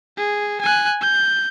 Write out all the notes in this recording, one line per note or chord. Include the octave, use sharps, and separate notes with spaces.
G#4
G#5 F#6
G6